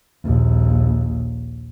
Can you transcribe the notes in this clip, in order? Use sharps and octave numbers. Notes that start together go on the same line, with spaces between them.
A#1 D#2